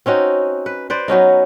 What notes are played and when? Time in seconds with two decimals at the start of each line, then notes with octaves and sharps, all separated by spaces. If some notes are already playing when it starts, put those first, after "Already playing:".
0.06 C4 C#4 D#4 F#4
0.66 B4
0.90 B4 C5 D5
1.08 F#3 B3 C#4 D#4